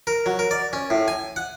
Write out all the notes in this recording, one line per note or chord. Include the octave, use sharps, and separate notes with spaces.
A#4
F#3
A#4
D5
C#4
A2
G#5
F#5